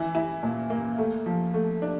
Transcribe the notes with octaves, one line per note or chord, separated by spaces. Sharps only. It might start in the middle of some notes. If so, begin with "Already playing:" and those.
Already playing: E3 E4
E4
A#2
A#3
A3
F3
A3
D4